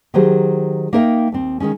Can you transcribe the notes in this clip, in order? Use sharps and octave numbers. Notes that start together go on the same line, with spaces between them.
D#3 F#3 G4 G#4 C5
A#3 D#4 A#4 E5 G5
D#2 C4
D#3 F3 G#3 C#4